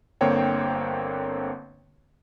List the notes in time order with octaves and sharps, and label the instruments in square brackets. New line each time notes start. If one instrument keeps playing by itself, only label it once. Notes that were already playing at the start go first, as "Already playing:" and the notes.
[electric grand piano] G1 D3 A#3 C4 C#5 G5